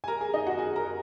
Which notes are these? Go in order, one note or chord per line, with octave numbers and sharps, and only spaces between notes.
G#5
A#4 A#5
G#4 G#5
D#4 D#5
F#4 F#5
G#4 G#5
A#4 A#5